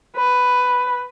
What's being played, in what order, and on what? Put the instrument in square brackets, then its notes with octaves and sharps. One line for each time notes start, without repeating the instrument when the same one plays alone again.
[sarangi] B4